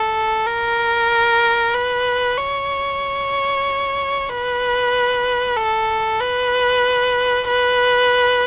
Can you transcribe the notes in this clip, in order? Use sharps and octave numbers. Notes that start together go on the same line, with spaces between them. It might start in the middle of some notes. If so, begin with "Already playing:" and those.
Already playing: A4
A#4
B4
C#5
B4
A4
B4
B4